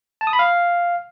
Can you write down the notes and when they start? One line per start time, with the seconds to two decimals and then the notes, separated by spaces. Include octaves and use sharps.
0.21 A5
0.27 D#6
0.33 B5
0.39 F5